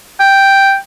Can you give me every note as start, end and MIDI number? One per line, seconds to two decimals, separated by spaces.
0.20 0.76 79